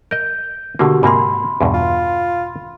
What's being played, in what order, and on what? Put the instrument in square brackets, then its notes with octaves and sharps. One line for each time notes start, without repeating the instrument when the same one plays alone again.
[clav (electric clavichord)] A#4 D#5 [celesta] G6
[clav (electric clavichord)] B2 D3 A#3 [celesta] F#4 G4 F#5
[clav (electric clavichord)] G#2 C3 A#3 [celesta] B5 C6
[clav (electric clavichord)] E2 G2 B2
[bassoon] F4